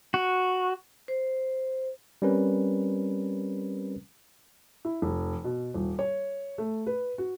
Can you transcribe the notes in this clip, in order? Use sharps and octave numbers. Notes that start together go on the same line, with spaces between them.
F#4
C5
G3 C4 C#4 A#4 B4
E4
F1
B2
D#1
C#5
A3
B4
F#4